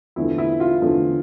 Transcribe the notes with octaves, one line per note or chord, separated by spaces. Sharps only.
E2 D3 F3 A3 E4
E4
F4
E2 D3 F3 A3